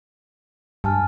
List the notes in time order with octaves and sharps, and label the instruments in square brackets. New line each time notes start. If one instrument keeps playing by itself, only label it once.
[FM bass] G2 [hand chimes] G#5 A5 F6